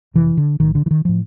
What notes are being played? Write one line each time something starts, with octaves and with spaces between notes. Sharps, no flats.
F1 F2 C3 E3
D3
B1 A2 D#3
D3
E3
D#3
A2 F3